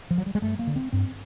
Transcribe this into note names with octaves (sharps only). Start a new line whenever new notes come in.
F3
F#3
G3
G#3
G2 A3
A#3
D3
C4
G2 C4